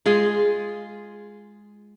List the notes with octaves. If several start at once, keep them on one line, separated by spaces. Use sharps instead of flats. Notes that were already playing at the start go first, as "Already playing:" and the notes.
G#3 F4 G#4